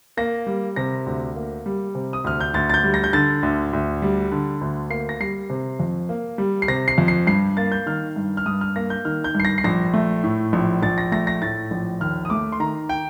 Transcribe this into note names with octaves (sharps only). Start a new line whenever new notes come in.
A#3 A#6
G3
C3 A#6
D2
A#3
G3
C3
D#6
D2 F6
G6
D2 A6
A6
G6
G3
A#6
G6
D3 A6
D2
D2
G3
D3
D2
A#3 C7
A#6
G3 C7
C3
F2
A#3
G3
C7
C3 A#6
C7
F2
C7
G2 C7
A#3 A6
G6
D#3 F6
G2
F6
G2 D#6
F6
A#3 A#6
G6
D#3 F6
G6
G2 C7
A#6
C7
A#1 A#6
A3
A2
A#1
A#1 A6
A#6
A3 A#6
A#6
A2 A6
A#1
D#2 F6
D#6
A3 D6
C6
D#3 A#5
G5